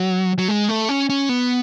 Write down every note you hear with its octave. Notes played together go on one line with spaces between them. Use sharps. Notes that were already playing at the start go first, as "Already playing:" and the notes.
Already playing: F#3
F#3
G#3
A3
C#4
C#4
B3